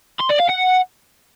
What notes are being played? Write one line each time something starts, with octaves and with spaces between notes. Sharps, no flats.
C6
D5
F5
F#5